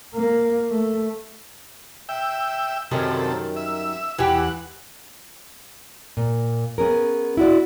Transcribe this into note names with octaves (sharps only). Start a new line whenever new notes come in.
A#3
A3
E5 G5
F#2 C3 D#3 G3 A4
E5
E2 E3 G4 F#5
A#2
B3 C#4 G#4 A#4
E4 F#4 D5